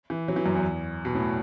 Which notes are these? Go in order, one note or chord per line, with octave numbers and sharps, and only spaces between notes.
E3
F#3
E3
F#2
E2
B2
A2